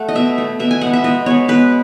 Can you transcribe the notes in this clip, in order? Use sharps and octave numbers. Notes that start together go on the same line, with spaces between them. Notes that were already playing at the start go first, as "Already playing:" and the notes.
Already playing: A3 F#5
D#5
B2 E5
A3
B2 E5
G#5
G#3 F#5
B3
E5
B2 D#5
G#3 B3 C#5
B2 B4